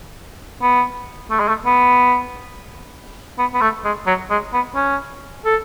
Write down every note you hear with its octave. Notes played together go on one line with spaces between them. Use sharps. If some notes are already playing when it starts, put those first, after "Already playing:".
B3
A3
G#3
A3
B3
B3
B3
A3
G#3
F#3
G#3
B3
C#4
A4